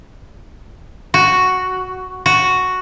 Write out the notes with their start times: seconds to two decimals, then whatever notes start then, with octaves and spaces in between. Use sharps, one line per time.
1.14 F#4
2.26 F#4